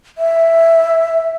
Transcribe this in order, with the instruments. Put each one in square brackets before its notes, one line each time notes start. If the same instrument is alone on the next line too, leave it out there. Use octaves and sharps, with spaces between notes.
[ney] E5